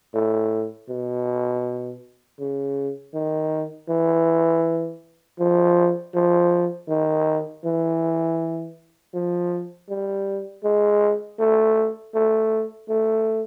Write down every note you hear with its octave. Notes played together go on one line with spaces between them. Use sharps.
A2
B2
C#3
D#3
E3
F3
F3
D#3
E3
F3
G3
G#3
A3
A3
A3